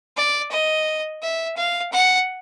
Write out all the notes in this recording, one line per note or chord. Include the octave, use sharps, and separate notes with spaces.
D5
D#5
E5
F5
F#5